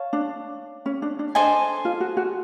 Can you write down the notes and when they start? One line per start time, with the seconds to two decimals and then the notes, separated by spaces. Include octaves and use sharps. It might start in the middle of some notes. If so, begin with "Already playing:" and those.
Already playing: C#5 F5 A5
0.13 D4
0.86 C#4
1.02 D4
1.19 D4
1.35 D4 A4 C5 D#5 G#5
1.85 F4
2.00 F#4
2.17 F#4